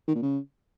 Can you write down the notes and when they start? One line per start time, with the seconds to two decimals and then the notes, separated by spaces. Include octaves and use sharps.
0.08 D#3
0.15 A#2
0.22 C#3